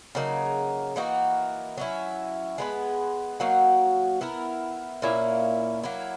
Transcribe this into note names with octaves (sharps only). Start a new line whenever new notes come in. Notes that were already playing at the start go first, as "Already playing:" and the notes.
C#3 F#3 A#3 D#4
E3 A#3 D#4 F#4
F#3 C#4 E4
G#3 B3 E4 B4
F#3 A#3 D#4 F#4
B3 E4 A#4
A#2 A#3 C#4 E4
F#3 A#3 E4